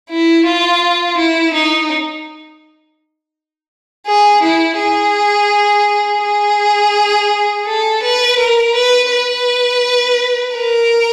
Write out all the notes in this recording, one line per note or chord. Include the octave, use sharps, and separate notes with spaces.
E4
F4
E4
D#4
G#4
E4
G#4
G#4
A4
B4
A#4
B4
B4
A#4